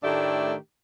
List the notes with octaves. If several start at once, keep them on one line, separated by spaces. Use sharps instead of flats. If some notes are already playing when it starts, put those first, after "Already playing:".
A2 D#3 A3 D4 G4 E5